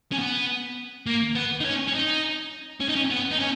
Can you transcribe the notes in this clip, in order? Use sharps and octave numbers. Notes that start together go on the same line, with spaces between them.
C#4
B3
A#3
B3
D#4
C#4
C#4
D#4
C#4
D#4
C#4
B3
D#4
C#4